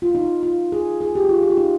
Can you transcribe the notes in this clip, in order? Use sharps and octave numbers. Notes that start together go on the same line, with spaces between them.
F4
D#4
F4
G#4
G#4
G4
F4
G4
F4
D#4